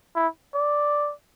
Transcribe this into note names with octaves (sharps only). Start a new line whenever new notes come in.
E4
D5